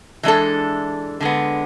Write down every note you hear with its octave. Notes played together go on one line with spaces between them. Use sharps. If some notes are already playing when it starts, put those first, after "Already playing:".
E3 G#3 D4 A4
D3 G#3 B3